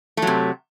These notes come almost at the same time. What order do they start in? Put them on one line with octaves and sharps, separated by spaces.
A3 F#3 C3